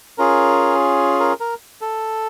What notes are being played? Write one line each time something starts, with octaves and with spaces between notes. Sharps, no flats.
C#4 F4 G#4 A#4
A#4
A#4
A4